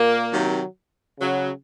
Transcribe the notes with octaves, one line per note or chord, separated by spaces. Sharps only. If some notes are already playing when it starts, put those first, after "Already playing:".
Already playing: A#2 A#3
C3 D#3 F#3
C#3 F#3